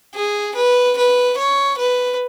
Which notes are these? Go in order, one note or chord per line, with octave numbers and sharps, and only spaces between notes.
G#4
B4
B4
C#5
B4